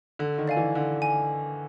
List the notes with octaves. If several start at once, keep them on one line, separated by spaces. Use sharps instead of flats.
D3 A4
D#3
D5 F5 G#5
E3
D3 A4
G#5